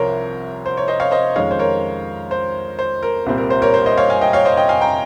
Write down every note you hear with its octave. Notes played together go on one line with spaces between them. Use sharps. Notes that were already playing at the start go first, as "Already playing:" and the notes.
Already playing: C2 C3 F3 C4 A#4 C5 C#5
C5
C#5
C5 D#5
C#5 F5
C5 D#5
F2 D#3 G#3 C#4 C#5 F5
C5
A#4 C#5
C5
C5
A#4
C2 A#2 G3 C4 A#4
A#4
C5
A#4 C#5
C5
C5 D#5
C#5 F5
F5 G#5
D#5 G5
C#5 F5
C5 D#5
D#5 G5
F5 G#5
G5 A#5